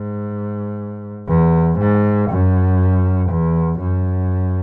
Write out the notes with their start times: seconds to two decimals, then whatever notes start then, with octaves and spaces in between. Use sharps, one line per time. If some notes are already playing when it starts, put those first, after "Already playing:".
Already playing: G#2
1.28 E2
1.78 G#2
2.30 F#2
3.30 E2
3.80 F#2